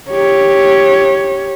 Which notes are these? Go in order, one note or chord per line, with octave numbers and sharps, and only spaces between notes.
G4 C#5